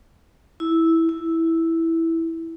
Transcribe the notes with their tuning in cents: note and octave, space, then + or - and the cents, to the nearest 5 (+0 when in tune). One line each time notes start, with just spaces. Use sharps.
E4 -10
E4 -5